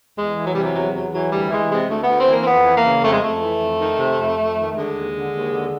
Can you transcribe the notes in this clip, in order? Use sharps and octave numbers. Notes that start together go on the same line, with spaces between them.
E2 G#3
E3
F#3
C3 G3
F#3
E2 F#3
E2 F#3
E3 F#3
D2 G3
E3 G#3
C3 G#3
D2 A3
D2 B3
C4
E3 A#3
C4
F2 B3
E3
A#3
C#3
F2 A3
G#3
F2 A3
E3
F2
D#3
C3
F2
F2
D#3
D3 G#3
D#2
D3
D#2
D3